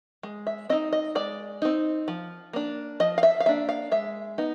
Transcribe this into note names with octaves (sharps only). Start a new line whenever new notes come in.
G#3
E5
C4 D#4 D#5
D#5
G#3 D5
C4 D#4
F3
A#3 D4
F3 D#5
F5
E5
F5
A#3 D4 E5
F5
G#3 E5
B3 D#4